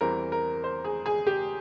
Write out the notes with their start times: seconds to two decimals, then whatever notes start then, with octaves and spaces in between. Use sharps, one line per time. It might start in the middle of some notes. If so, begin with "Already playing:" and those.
0.01 E2 E3 G3 C4 A#4
0.32 A#4
0.64 C5
0.84 G#4
1.06 G#4
1.27 G4